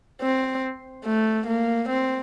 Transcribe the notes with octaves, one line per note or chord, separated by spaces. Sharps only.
C4
A3
A#3
C4